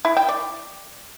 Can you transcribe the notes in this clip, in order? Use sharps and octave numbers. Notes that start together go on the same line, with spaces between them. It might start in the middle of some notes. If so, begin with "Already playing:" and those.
E4
G5
D5